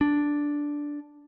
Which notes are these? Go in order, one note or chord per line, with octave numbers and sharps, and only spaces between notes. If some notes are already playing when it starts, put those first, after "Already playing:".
D4